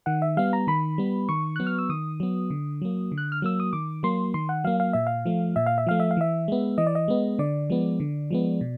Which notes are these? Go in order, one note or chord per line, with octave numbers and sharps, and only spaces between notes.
D#3 F#5
E5
G3 B3 F5
A#5
D#3 B5
G3 B3
D#3 C#6
F#3 B3 F#6
F6
E6
D#3 D#6
F#3 B3
D3
F#3 A#3
D3
F#6
F6
F#3 A#3 E6
D#6
D#3 D6
F#3 A#3 C6
D#3 C6
F#5
F#3 A#3 F5
F5
A#2 E5
F5
F3 A3
A#2 E5
F5
E5
F3 A3 F5
E5
F5
E3 E5
G#3 B3
E3 D#5
D5
D#5
G#3 B3
D3 D5
F3 G#3 B3
D3
F3 G#3 B3
B2